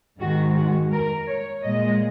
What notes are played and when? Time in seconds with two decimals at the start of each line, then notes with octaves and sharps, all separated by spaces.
0.21 G#2 D#3 G#3 F#4
0.57 F#4
0.93 A#4
1.29 C#5
1.64 A#2 G#3 D#5